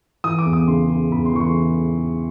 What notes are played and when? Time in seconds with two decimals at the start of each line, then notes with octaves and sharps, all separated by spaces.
0.24 E3 D#6
0.39 D6
0.46 E2
0.53 D#6
0.68 C#3 C6
0.89 C#3 C6
1.12 E2 B5
1.26 C6
1.33 E3 C#6
1.40 C6